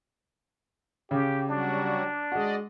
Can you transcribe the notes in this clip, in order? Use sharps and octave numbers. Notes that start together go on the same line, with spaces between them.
C#3 G4
F#3 G3 D4 F#4
G#3 F#4 D5 D#5